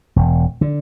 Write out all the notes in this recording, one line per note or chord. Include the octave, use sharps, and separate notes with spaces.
E1
D3